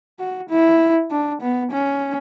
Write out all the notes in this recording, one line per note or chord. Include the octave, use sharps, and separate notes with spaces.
F#4
E4
D4
B3
C#4